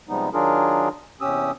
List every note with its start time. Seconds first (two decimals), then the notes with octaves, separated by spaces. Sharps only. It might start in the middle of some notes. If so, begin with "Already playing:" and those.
0.09 C3 F3 G3 G#3 B3 D#4
0.33 D#3 F#3 D4 F4 G#4 A#4
1.21 E2 C3 C#4 G4 D#6 E6